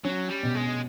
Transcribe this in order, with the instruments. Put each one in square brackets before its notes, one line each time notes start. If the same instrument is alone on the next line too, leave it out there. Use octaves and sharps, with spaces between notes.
[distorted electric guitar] F#3 [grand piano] C#4
[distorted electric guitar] G3
[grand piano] B2
[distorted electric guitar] G#3